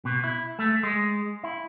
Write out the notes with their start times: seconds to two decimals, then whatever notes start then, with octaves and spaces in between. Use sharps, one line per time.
0.05 B2
0.24 E4
0.59 A3
0.83 G#3
1.44 E4